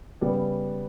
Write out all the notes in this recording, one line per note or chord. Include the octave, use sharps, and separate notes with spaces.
C#3 G3 B3 D5